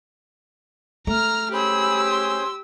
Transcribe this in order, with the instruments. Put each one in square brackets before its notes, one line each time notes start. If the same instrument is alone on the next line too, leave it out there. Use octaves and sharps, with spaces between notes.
[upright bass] A3 [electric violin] A#5 F6
[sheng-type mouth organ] C#4 G#4 C5 [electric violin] G4 E6 [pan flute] B5
[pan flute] C6